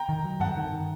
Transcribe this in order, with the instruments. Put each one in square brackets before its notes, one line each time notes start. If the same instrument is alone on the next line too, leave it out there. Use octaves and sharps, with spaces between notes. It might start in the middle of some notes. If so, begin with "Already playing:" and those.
Already playing: [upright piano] G5 A#5
[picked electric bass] D#3
F#3
[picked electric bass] G2 [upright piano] F#5 A5
[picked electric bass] D#3
D#3